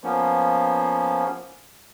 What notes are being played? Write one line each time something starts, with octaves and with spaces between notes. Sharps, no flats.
F3 A#3 B3 C#4